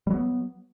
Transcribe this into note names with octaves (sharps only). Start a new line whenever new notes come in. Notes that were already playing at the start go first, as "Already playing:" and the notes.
F#3 G3 B3